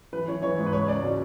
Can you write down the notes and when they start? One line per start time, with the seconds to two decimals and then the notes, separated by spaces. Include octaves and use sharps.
0.13 E3 B4
0.28 E3 C#5
0.42 E3 C#5
0.58 G#2
0.66 B4
0.73 C#2 C#5
0.88 C#2 D5
1.03 B2